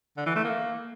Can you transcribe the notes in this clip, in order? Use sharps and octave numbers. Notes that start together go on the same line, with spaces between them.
D3
E3
A3
A#3